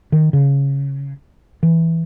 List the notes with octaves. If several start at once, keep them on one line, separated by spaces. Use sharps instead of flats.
D#3
C#3
E3